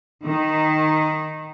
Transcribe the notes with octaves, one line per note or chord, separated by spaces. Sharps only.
D#3